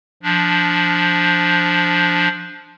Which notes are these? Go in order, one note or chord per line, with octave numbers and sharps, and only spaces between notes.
F3 D4